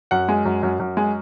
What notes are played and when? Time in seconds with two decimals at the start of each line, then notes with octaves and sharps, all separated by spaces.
0.11 F#2 F#5
0.28 G#3
0.45 F#2
0.63 F#2
0.79 F#2
0.97 G#3